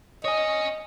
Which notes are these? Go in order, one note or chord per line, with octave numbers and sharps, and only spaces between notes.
C#5 D#5 G#5